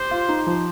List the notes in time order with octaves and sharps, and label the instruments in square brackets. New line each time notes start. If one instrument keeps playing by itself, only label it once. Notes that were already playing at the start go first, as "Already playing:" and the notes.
Already playing: [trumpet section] G4 C5
[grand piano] F4
D#4
F3